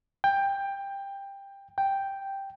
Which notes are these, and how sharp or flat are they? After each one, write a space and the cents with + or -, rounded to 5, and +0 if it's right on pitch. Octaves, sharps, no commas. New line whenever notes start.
G5 +15
G5 +0